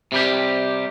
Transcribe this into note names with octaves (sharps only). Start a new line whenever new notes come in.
C3 G3 G4